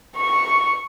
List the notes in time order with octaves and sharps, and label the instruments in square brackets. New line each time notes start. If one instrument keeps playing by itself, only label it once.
[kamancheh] C#6